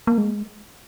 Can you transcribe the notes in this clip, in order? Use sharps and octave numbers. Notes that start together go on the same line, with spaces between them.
A#3
G#3